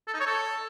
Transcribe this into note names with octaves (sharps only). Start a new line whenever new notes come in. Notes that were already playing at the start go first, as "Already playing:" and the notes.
A4
D#4
C#5
A4